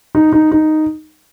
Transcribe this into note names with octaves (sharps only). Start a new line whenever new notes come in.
D#4
D#4
D#4